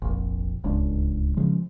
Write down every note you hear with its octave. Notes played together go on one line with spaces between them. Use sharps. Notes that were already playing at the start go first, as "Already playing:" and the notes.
F1 A#1
D1 C#2 G#3 D4
C#3 F3 G#3